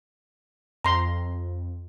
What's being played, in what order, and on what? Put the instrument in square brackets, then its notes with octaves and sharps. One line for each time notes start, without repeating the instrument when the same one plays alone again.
[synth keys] F2 [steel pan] A#5 C6